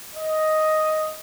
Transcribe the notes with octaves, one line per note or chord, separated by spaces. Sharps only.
D#5